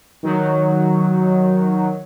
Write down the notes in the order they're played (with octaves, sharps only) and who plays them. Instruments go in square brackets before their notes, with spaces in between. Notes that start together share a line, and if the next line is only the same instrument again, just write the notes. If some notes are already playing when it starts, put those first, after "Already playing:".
[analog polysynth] D#3 F#3